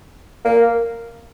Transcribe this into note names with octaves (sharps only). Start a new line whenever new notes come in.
A#3